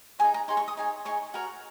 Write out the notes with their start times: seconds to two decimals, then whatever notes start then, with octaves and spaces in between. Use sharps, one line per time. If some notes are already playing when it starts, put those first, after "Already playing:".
0.19 D#4 G#4 C#5 G#5
0.34 A#5
0.48 D#4 G#4 C#5 C6
0.57 C#6
0.68 D#6
0.77 D#4 G#4 C#5
1.05 D#4 G#4 C#5 C#6
1.34 F#4 A#4 C#5